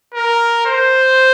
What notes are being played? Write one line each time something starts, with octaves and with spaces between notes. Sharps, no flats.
A#4
C5